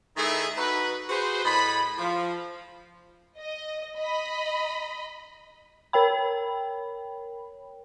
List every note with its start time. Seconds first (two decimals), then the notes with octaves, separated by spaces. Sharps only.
0.17 D#3 A3 D#4 E4 G#4
0.57 D#4 F#4 B4
1.10 F#4 G#4 B4 C5
1.45 A2 D#5 B5
1.99 F3
3.38 D#5
3.98 D#5 B5
5.93 A#4 C#5 G5 B5